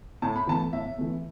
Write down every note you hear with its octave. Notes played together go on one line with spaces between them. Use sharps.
A2 A5
B5
E3 A3 A5
A2 E5
E3 A3